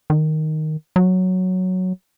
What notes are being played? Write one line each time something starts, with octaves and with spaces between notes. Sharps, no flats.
D#3
F#3